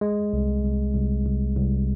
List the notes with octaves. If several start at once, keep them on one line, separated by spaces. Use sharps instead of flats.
G#3
C2
C2
C2
C2
C2